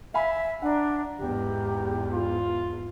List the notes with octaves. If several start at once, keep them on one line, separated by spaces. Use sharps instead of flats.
E5 F5 G#5 B5
D4 F#5 A#5
E2 G#2 G4
F4